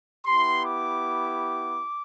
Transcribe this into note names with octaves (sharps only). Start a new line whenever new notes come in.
B3 E4 G4 C6
D6